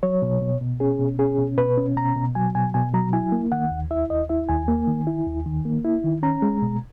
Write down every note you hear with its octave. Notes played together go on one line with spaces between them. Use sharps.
F#3 C#5
B2
B2
B2
C#4 G#4
B2
C#4 G#4
B2
B2 B4
C#4
B2 A#5
B2
F#3 G#5
B2 G#5
B2 G#5
F#3 A#5
E4 G#5
A#3
D#3 F#5
D#2
E4 E5
D#2 D#5
E4 E5
D#2 G#5
A#3
D#3
E4
D#2
D#3
A#3
E4
D#3
C#4 A#5
G#3
B2